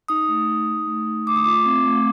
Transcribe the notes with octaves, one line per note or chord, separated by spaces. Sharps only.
D#4 D#6
A3
D#4
D#4
A3
D#4
A3 D6
D#6
F4 D6
C4
A3